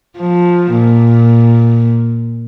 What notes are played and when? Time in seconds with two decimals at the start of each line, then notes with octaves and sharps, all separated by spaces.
0.17 F3
0.72 A#2